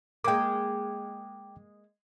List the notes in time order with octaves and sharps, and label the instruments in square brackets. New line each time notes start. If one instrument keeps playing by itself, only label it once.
[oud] G#3 A#3 [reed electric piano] G5 D6